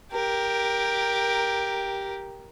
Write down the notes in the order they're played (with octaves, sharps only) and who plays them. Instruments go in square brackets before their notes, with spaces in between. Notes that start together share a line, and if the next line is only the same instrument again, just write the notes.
[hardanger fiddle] G4 A#4